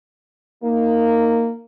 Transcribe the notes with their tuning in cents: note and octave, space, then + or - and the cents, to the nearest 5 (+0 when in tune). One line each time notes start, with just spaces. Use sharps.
A#3 -15 D#4 +0